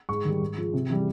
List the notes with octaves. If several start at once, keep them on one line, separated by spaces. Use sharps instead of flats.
G#2 C#6
D#3 G3
G#2
F3 G#3
C3
E3 G3